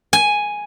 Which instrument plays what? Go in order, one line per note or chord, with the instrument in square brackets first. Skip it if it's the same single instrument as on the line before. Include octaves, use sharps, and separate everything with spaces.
[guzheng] G#5